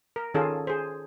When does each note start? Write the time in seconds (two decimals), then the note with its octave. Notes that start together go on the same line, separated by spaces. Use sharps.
0.16 A#4
0.34 D#3 C#4 F4 G#4 A4
0.67 G#4 C5